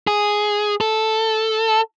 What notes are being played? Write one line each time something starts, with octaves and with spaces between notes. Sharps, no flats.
G#4
A4